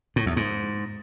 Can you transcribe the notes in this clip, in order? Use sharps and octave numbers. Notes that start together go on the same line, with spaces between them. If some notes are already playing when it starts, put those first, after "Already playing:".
A2
E2
G#2